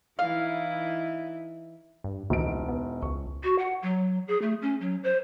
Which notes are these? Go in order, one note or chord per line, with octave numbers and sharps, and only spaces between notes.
E3 D#4 E4 F5
G2
E1 C#2 D#4 D7
B3
C#2 C#6
F#4
F#5
F#3
G#4
A3
C#4
F#3
C5